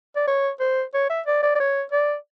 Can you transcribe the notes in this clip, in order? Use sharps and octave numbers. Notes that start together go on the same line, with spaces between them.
D5
C#5
C5
C#5
E5
D5
D5
D5
C#5
D5